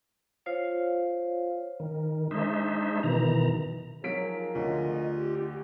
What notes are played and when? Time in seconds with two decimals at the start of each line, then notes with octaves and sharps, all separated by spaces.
0.46 F4 C5 C#5 F5
1.80 D#3
2.31 G#3 D4 D#4 C5 E5
3.03 B2 D#3 E3 A#5
4.04 F3 F#3 D#4 G#4 A#4 B6 D7
4.55 D2 F4 D#5
5.17 G4